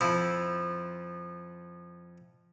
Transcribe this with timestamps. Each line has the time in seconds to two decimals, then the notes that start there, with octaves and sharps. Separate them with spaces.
0.01 F2 F3 E4